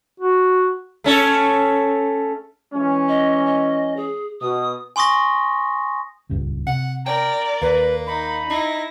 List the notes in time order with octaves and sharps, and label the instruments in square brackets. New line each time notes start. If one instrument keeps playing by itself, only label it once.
[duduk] F#4
[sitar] A3 C#4 A4
[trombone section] E3 G#3 C#4
[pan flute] D#5
D#5
G#4
[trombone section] B2 [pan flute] D#6
[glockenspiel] G#5 C6 C#6 D#6 A#6
[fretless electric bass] D#1 C#2 G2
[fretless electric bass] C3 [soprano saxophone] F#5
[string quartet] A#4 D5 [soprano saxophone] G5
[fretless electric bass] D#2 [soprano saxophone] A#3 [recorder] B4
[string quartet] D#4 [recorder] B5
[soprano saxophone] D#4 [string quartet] E4 A#6